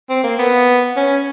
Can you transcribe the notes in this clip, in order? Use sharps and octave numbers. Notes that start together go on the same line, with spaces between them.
C4
A#3
B3
C#4